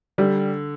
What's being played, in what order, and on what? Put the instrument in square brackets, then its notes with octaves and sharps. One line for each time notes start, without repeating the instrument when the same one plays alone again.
[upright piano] D3 [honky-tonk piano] G3